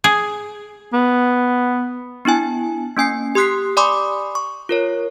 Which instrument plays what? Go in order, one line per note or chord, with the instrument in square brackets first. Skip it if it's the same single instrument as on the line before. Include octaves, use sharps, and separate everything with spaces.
[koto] G#4
[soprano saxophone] B3
[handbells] B3 D4 E4 G#5
A#3 C#4 G#5 C7
G4 C6 D#6 F#6 B6 C7
D5 G#5 B5 C6 D6 D#6
C#6
F4 A#4 C#5